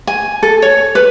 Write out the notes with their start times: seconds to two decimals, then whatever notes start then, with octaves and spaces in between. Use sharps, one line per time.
0.07 G#5
0.43 A4
0.62 C#5
0.95 B4